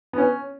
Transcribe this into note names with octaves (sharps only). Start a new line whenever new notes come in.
B3
C#4